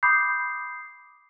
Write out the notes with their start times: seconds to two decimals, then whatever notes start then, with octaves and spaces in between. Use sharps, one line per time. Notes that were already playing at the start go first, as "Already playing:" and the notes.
0.03 B5 D6 D#6 G6 C7